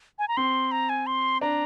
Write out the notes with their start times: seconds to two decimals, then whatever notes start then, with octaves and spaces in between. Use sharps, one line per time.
0.19 G#5
0.28 A#5
0.37 C4 C6
0.72 A#5
0.89 G#5
1.07 C6
1.41 D4 A#5